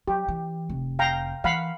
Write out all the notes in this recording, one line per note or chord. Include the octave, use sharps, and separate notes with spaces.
F#3 G4
E3
F1
F5 G5 A#5
E3 F5 F#5 B5